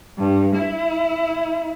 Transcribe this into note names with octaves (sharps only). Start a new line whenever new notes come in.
G2
E4